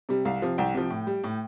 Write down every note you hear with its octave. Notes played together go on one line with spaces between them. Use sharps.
C3 G3
C2 F5
C3 F3
C2 G5
C3 F3
A2
G3
A2